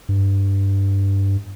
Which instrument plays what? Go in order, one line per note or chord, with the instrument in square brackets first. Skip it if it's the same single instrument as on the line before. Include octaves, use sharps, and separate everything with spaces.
[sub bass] G2